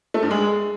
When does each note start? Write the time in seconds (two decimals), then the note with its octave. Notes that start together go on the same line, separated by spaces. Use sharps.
0.14 A3
0.22 G2
0.31 G#3